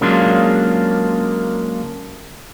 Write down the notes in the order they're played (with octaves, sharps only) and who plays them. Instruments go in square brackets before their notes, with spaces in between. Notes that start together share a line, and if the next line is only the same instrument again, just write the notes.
[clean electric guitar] C#3 F#3 G#3 A#3 D4 F4